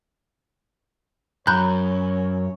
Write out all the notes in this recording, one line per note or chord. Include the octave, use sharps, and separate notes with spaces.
F#2 C#5 A#5 B5 F#6 G6